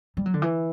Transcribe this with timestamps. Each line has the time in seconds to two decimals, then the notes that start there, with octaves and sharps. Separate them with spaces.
0.17 G3
0.26 F#3
0.34 D3
0.42 E3